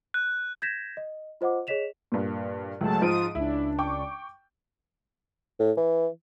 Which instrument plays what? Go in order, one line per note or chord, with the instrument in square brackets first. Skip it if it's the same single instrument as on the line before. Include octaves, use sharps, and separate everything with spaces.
[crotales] F#6
[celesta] G6 G#6 A#6 B6 E7
D#5
F4 C5 D#5 F#5 D6
G#4 C#5 D#5 B6 E7 F7
[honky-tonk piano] G2 A#2
[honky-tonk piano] C#2 G#3 [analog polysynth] F#3 A3 A5
[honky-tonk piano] G#2 F3 D7 [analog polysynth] F4 D#6 D#7
[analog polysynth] C#2 D4 [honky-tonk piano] E4
[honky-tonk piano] G5 C#6 D6
[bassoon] A2
E3